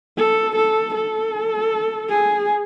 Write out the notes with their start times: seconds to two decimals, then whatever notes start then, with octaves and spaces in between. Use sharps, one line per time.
0.18 A4
0.56 A4
0.95 A4
2.09 G#4